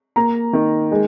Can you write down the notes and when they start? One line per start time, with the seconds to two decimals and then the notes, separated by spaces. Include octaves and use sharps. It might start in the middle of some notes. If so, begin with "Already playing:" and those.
0.16 A#3 A#5
0.53 D#3
0.91 G#3